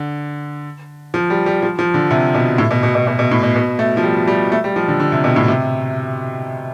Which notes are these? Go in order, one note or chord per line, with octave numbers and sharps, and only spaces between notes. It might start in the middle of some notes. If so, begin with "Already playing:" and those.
Already playing: D3
F3
G3
G3
F3
F3
D3
C3
B2
A2
B2
B2
B2
B2
B2
A2
B2
B2
A3
F3
G3
G3
A3
G3
F3
D3
D3
C3
B2
A2
C3